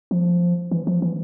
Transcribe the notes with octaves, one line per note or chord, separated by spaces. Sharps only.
F3
E3
F3
E3